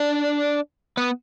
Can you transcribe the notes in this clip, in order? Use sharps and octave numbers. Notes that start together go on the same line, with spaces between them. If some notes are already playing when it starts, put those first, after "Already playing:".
Already playing: D4 D5
B3 B4